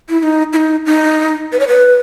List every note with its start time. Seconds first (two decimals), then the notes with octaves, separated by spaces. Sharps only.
0.09 E4
0.20 E4
0.23 D#4
0.53 E4
0.56 D#4
0.86 D#4
1.53 B4
1.60 C#5
1.68 B4